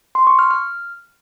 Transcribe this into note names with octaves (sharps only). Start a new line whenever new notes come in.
C6
C#6
F6
F6